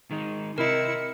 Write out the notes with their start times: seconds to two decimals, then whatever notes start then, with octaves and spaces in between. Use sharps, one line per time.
0.11 D#3 G#3 D#4
0.58 C3 E4 A#4 D#5 C#7